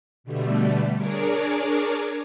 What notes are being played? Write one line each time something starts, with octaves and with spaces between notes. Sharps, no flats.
B2 D3 G3 A3
D4 G#4 A#4 C#5 D6